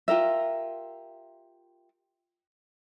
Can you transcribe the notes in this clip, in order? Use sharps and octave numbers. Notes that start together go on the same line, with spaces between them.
F4 G4 A#4 E5